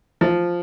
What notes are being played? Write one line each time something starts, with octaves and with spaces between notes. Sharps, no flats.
F3